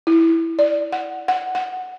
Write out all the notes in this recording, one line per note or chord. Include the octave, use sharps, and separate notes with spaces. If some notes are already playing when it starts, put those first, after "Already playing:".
E4
D5
F#5
F#5
F#5